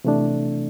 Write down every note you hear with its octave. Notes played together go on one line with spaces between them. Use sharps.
C3 E3 A3 D4